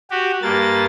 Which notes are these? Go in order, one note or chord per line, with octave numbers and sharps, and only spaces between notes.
F#4 G4
G2 A#3 A6